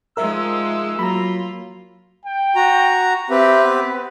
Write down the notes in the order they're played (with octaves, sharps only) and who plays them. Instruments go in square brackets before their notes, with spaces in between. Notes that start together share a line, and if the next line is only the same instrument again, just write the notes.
[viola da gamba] F3 G#3 D#4 [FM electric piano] A#4 E5 [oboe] E6
[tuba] F#3 [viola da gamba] A#3 F4 [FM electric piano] A#5 B5
[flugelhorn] G5
[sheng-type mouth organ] F#4 A#5
[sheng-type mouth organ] C4 G4 B4 [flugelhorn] E5
[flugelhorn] B3